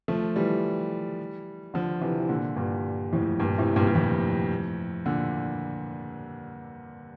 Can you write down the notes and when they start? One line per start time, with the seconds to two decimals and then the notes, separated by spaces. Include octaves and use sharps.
0.08 F3 A3
0.36 E3 G3
1.74 D3 F3
2.01 C3 E3
2.19 E3
2.29 A#2 D3
2.57 G2 A#2
3.13 F2 A2
3.40 G2 A#2
3.58 A2 C3
3.76 G2 A#2
3.87 G2
3.95 F2 A2
5.06 A#2 D3